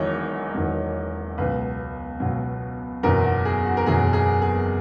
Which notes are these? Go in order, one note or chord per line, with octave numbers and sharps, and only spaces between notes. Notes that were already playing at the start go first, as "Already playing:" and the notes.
Already playing: E1 E2 D#3 F#3 C#5 D#5
E1 E2 D#3 F#3
C#2 B2 F#3 B4
C#2 B2 F#3
F#1 E2 B2 F#3 A#4
F#4
G#4
F#4
A#4
F#1 E2 B2 F#3 G#4
G#4
G#4